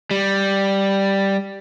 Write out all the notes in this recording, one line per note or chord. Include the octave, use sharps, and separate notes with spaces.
G3